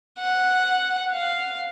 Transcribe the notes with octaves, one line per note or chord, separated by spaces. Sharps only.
F#5
F5